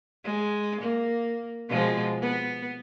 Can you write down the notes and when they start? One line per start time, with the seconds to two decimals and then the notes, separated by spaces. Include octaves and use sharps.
0.24 G#3
0.81 A#3
1.69 B2 F3 G#3
2.21 B3